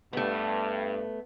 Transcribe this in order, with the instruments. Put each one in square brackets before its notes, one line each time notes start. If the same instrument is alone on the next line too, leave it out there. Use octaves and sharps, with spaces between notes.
[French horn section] G2 [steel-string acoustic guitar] A3 B3